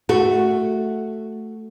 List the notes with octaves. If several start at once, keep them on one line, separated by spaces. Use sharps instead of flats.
A3 F#4